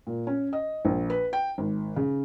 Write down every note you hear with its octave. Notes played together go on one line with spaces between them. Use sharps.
A#2
C#4
D#5
A#1
B4
G5
G#1
C#3